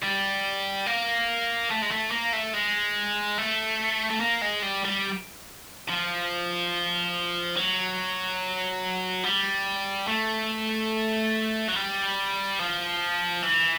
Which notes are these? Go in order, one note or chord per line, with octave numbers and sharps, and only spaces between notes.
G3
A#3
A3
G#3
A3
A#3
A3
G#3
A3
A3
A#3
G#3
G3
G3
F3
F#3
G3
A3
F#3
G3
F3
E3